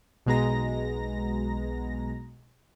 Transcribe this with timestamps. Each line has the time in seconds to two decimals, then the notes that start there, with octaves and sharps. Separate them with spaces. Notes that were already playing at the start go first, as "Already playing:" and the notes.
0.26 B1 B2 G#3 B3 A#5 A#6